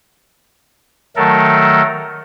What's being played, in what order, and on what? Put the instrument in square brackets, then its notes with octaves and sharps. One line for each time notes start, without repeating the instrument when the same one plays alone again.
[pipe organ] D#3 F#3 A3 A4 A#4